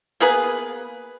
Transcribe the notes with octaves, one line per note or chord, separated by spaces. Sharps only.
A#3 B3 G#4 B4